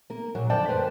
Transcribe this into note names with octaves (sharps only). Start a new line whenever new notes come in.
A#3 A#4
A#2 F#3
F2 D3 F3 D5 G5 A5
F#2 A#3 B4 C5